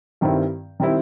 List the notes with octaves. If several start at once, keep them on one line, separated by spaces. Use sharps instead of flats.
G2 D#3 G3 C4 E4
D#3 G3 C4 E4